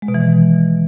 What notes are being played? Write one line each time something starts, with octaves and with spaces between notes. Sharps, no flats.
G#3
B2
E3
D#3